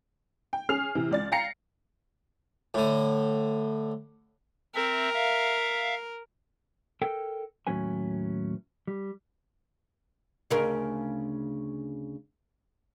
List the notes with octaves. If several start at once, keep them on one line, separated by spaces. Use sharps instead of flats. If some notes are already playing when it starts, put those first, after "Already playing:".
G5
C#4 G#4 F6 C7 F7
C3 E3
C#2 D5 A6
F5 G5 A#5 A#6 C7 C#7
A2 D3
C4 A#4 E5
E5 F5
A4 A#4 G5
D#2 A2 F#3 C#4 B4 G#5
G3
D2 C#3 A#4